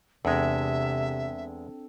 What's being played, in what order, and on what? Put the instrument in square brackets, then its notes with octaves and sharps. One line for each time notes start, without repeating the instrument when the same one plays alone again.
[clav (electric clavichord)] E2 G#3 [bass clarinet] C3 [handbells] C4 D4 A4 [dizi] E5